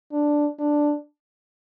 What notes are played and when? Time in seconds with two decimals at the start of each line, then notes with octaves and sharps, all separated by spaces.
0.12 D4
0.59 D4